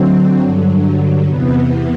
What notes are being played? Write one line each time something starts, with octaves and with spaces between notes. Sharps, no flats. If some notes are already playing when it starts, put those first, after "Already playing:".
Already playing: D3 F#3 C4
G2 D3 F#3
E2 C3 E3 B3